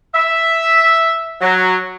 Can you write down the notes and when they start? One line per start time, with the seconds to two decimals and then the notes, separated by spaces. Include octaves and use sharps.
0.15 E5
1.41 F#3